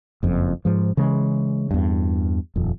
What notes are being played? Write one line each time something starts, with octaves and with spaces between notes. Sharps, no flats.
F#1 F2
G#2 F3
C#3 E3 G#3
E2 G2
D#1 F2